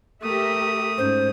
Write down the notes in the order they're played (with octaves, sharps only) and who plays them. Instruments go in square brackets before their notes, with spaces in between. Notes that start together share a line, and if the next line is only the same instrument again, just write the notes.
[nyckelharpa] A3 D#6 [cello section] G4 A#4 E5
[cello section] G#2 [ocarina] C#4 [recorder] C5